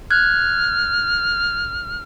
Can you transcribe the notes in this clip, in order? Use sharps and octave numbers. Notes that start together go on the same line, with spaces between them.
F6 F#6 G#6